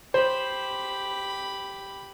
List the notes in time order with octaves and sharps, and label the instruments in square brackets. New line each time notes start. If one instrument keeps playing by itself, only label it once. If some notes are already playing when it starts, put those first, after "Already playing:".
[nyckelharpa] G4 B5 [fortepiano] C5